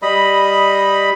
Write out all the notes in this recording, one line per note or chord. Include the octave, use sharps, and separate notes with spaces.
G3 D#5 B5